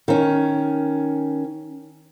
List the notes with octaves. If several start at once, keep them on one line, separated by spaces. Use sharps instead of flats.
D#3 C#4